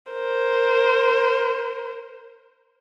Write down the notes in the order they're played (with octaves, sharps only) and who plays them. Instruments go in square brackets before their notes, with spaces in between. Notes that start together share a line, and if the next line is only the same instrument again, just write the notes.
[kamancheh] A#4 C5